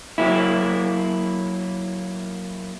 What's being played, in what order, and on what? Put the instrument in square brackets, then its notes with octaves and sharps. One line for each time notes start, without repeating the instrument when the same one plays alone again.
[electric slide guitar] F#3 A#3 E4